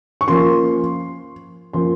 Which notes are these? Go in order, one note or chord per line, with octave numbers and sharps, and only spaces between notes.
C#6
F3 A#3 C#4 C6
F3 A#3 C#4 C6